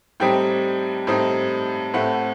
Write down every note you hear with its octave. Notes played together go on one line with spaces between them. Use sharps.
A2 G3 C4 D#4 G5
A2 G3 C4 D#4
A2 A3 C4 F#5